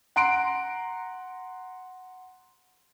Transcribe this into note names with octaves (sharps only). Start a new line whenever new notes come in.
F#5 A#5 C6 F#6 D7